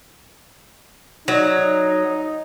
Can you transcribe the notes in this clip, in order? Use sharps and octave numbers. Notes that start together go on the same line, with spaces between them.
F#3 D#4